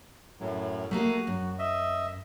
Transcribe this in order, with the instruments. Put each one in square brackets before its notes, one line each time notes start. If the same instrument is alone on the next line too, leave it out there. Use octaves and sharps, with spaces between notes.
[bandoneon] F#2 A2 F#3
[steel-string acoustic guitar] A3 A#3 G#4 [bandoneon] F#4
[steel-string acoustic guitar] F#2
[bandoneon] D#5 E5